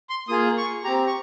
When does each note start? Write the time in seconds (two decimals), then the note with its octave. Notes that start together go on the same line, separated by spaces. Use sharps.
0.10 C6
0.28 A#3 F4 G#4 D#6
0.57 C#6
0.84 C4 G4 A#5
1.07 C#6